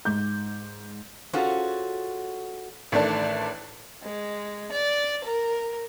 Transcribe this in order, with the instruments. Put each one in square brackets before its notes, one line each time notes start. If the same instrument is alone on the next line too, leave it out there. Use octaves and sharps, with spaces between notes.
[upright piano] G#2 D6 G6
[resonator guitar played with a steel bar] C#4 F4 F#4 G#4 A4 C5
[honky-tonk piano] A1 D#3 A3 D4 D5 A5
[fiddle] G#3
D5
A#4